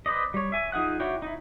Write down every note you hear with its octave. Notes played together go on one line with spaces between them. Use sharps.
B4 C5 D5 D#5
G3 C#5
E5 G#5
F3 D#4 G#4 F#5 F#6
D4 E4 F#4 C#5 G5
D#4 E4